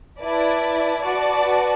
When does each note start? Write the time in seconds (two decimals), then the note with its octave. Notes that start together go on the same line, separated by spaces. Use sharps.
0.20 E4 B4 D5 A5
1.03 F#4 B4 D5 A5